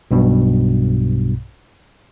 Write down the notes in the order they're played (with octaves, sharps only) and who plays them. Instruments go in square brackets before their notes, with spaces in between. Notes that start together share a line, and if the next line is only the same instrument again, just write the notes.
[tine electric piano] B1 G2 B2